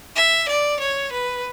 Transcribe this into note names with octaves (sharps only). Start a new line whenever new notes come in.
E5
D5
C#5
B4